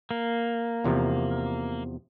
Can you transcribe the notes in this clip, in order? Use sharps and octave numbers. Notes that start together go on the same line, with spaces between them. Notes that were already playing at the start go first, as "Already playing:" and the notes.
A#3
E2 C3 F3